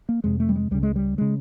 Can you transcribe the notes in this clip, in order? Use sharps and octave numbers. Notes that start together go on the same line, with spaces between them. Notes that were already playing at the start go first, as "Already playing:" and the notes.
A#3
F2 C3 G#3
A3
G3
G#3
C#2 C#3 G3
G#3
G3
C#3 G#3